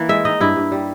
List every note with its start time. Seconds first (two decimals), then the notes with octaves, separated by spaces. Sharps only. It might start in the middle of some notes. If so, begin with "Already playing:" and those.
Already playing: E3 A#3
0.09 G#3 E5
0.25 D#4 D#5
0.40 G2 E4
0.56 G2
0.72 G3